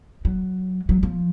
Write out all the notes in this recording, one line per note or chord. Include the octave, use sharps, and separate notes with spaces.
F#3
F#3
F3